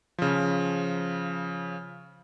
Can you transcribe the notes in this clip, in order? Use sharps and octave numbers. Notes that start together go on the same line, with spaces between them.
C#3 F3